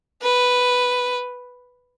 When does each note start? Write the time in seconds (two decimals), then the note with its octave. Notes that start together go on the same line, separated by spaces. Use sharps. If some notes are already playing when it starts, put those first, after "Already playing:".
0.22 B4